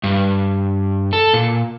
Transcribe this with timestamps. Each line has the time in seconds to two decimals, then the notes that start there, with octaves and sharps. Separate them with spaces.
0.04 G2
1.13 A4
1.34 A#2